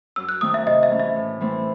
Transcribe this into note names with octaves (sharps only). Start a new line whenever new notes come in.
F#2 E6
F#6
D#3 A3 C4 D#6
E5
C3 D#5
E5
E3 A3 C#4
E5
A2
E3 A3 C4